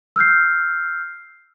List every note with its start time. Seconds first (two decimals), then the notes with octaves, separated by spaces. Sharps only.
0.16 E6 F6 G6 C7